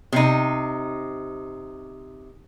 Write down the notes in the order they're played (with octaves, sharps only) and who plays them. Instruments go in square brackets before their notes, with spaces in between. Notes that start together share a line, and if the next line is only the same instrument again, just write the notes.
[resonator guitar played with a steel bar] C3 D#4